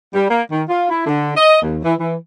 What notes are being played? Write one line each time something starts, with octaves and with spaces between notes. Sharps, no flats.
G3
A#3
D#3
F4
E4
D3
D#5
D#2
E3
E3